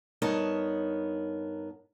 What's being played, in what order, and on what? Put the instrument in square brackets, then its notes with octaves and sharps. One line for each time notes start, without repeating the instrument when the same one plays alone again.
[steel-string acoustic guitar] G2 B3 D#4 A#4 C#5 A5